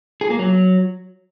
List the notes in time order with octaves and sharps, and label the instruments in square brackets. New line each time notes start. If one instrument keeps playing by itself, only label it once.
[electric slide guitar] G#4
A#3
F#3